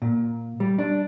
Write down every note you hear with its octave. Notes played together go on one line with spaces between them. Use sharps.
A#2
G3
D4